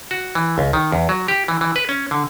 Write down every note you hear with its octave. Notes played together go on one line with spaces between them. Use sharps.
F#4
E3
C#2
D#3
E2
F#3
G4
E3
E3
B4
C#4
D3